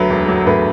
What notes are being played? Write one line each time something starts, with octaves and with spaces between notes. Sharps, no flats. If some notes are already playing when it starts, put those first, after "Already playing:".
Already playing: D2 F#3 B4
E1
F#3
D2 B4